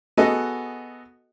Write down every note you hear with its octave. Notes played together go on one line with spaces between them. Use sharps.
B3 F#4 G#4 A4 D#5